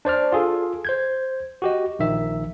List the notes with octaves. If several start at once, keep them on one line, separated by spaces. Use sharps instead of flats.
D4 C5 D5 F6
F4 G#4 A4
C5 G6 G#6
F#4 G4 D#5
A#1 D#3 E5